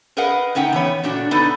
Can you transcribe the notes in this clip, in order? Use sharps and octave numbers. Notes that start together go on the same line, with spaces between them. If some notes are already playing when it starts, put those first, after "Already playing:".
G#4 A#4 B4 D#5 F#5
A2 C#4 D#4 F#5 G5
E3 B3 C#5
A#2 A3 D4 F#4
B3 D4 D#4 A4 B4 D#5